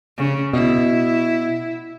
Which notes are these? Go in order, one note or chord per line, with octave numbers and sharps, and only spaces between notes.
C#3
B2 E4